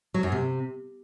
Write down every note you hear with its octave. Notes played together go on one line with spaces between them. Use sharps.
F#3
F#2
C3